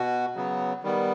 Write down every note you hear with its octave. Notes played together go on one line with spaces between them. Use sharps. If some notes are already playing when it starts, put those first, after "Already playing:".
Already playing: B2 F#4
C#3 F#3 B3
D#3 G3 B3